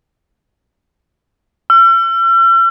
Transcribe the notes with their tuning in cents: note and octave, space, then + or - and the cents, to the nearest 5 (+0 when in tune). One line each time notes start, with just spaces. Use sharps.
E6 +45